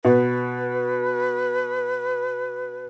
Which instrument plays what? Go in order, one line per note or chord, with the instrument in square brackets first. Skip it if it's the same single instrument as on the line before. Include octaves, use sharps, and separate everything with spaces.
[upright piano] B2 [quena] B4